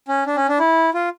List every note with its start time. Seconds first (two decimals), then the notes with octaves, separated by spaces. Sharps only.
0.08 C#4
0.26 D4
0.37 C#4
0.48 D4
0.59 E4
0.94 F4